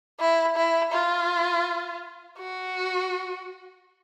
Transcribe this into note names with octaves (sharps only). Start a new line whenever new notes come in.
E4
E4
F4
F#4